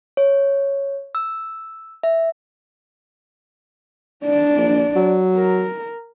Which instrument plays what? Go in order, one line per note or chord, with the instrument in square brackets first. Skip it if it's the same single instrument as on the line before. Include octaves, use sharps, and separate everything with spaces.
[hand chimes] C#5
E6
E5
[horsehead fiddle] D4 D5
[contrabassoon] A#1
F#3
[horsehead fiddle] A#4